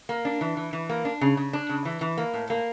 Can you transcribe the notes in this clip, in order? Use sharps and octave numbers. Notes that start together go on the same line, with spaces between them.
A#3
D4
E3
E3
E3
A#3
D4
C#3
C#3
D4
C#3
E3
E3
A#3
A2
A#3